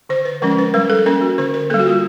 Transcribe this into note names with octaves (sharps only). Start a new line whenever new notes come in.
D3 C5
B4
F3 G#3 C#4 A#4
B4
G3 A#4
A4
A#3 C#4 A#4
F#4
D3 A#4
A#4
G3 A#3 A4
F#4
F4